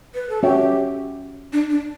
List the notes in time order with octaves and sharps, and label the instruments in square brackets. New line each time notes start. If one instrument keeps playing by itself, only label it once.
[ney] B4
A4
[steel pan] C#4 F#4 C#5 E5 G5 [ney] G4
[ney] D4
D4